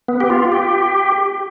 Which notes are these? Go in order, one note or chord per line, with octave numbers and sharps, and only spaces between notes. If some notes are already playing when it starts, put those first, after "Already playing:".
B3
G4
F4
G4